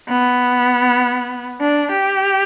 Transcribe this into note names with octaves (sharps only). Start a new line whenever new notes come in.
B3
D4
G4